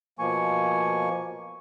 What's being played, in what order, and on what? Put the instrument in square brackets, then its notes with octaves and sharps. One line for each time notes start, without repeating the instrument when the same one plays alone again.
[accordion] B2 F3 A#3 G#5 C#6